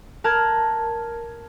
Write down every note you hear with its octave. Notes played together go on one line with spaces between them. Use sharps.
A#4 A5 F6 F#6 G#6